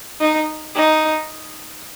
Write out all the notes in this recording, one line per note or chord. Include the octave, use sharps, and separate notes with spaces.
D#4
D#4